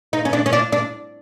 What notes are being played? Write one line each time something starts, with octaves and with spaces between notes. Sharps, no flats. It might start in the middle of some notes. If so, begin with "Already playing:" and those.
D#4
C#4
D4
C#4
D4
D4